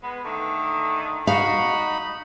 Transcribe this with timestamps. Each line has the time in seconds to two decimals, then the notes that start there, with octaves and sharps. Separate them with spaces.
0.02 G#3 B3
0.24 D3 D#3 A3
1.27 D#4 F#4 F5 B5